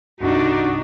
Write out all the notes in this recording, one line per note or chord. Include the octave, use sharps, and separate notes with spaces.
C2 G2 C3 D4 D#4 F#4